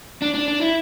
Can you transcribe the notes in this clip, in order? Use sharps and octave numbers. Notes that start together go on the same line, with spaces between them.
D4
D4
D4
E4